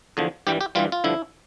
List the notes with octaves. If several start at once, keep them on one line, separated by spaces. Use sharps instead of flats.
E2 D3 F3
G2 E3 G3 G4
G4
G2 E3 G3 F4
F4
G2 D3 F3 E4